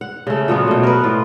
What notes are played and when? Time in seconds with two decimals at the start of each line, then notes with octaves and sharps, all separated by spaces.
0.01 F#5
0.27 C#3 A3
0.48 A#2 F3 F#3 B3
0.67 B2 A3
0.83 A#4 B4
1.03 A2 F4